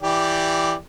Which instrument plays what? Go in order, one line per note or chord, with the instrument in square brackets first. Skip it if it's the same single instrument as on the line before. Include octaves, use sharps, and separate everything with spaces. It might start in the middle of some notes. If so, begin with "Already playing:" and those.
[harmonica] E3 G4 D5